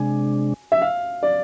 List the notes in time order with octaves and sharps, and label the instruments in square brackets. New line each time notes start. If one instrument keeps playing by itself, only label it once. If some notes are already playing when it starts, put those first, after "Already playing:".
Already playing: [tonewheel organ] C3 G#3 D4 [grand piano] G#5
[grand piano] E5
F5
D5